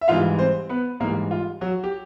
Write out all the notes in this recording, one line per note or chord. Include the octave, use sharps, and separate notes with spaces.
E5
G#2 E3 G3 F4 F5
C4 C5
B3 B4
G#2 E3 G3 A#3 A#4
F4
F#3 F#4
G4